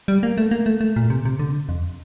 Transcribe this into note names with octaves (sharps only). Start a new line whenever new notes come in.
G3
A#3
A3
A#3
A3
A3
A#2
C3
C3
D3
F2